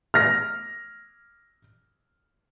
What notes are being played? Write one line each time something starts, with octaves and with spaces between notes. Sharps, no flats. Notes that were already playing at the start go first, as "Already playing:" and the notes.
F6 A#6